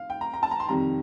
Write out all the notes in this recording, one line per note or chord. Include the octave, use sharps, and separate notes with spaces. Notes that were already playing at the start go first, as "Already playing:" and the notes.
Already playing: F5
G5
A#5
A#5
A5
A#5
C6
F2 C3 D#3 G3 A#5